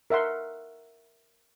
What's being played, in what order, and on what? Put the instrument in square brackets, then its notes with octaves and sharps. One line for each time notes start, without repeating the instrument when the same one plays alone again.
[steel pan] A#4 E5 F#5 C6